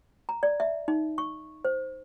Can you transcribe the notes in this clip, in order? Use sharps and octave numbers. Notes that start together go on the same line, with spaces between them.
A#5
D5
E5
D#4
C#6
C5